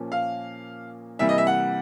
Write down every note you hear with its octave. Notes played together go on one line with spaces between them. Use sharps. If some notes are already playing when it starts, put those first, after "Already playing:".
Already playing: A#2 F3 A#3 C#4
F5
C3 E3 G3 A#3 E5
D#5
E5
F#5